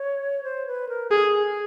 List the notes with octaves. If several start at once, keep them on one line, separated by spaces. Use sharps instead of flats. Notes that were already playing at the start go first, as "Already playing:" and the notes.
Already playing: C#5
C5
B4
A#4
G#4 A4
G#4